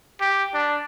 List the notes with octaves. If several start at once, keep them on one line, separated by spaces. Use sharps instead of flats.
G4
D4